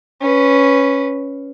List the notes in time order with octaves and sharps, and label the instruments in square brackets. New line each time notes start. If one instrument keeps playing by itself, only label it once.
[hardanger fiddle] C#4 B4